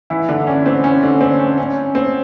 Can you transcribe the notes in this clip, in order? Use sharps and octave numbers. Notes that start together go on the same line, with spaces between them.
E3 E4
D3 D4
C#4
C4
C#4
D3 D4
C4
C#4
C#4
C4